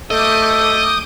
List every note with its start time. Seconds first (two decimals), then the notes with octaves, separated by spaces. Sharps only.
0.11 A3 A4 D#5 D6 G6 D#7